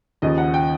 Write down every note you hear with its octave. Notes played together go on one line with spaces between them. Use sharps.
D#2 C#3 F3 D#5
F#5
G5